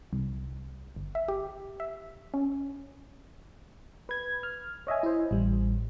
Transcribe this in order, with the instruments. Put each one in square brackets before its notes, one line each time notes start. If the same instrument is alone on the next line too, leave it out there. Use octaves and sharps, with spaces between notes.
[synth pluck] C2
G1
E5
G4
E5
C#4
[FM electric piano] B4 G#6
F6
C#5 D#5 E5 G#5
E4 C5
A1 G3